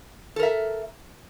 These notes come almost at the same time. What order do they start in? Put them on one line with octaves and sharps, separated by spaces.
A4 A#4 E5